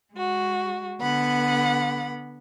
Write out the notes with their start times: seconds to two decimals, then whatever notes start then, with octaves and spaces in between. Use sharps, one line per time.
0.13 G#3 F#4
1.01 D3 B3 F#5 B5